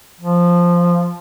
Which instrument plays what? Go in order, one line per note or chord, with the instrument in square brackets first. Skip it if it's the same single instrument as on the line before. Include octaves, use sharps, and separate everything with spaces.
[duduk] F3